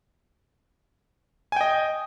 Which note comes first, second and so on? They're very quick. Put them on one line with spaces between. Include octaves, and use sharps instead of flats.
G#5 G5 D#5